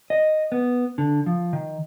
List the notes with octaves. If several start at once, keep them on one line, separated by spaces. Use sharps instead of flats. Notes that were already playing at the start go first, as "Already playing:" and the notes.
D#5
B3
D3
F3
D#3